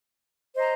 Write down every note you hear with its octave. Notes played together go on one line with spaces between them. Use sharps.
C5 D#5 A#5